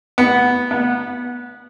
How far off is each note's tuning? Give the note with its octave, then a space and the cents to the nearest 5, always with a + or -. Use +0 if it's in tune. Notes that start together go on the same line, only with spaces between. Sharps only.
B3 -5
B3 -20